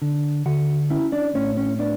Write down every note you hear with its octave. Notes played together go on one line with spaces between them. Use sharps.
D3
D3 F#4 F#5
C#4 E4 E5
D4 D5
A2 C#4 C#5
C#4 C#5
B3 D4 D5